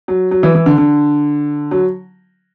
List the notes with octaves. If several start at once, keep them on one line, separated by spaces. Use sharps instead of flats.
F#3
F#3
E3
E3
D3
D3
F#3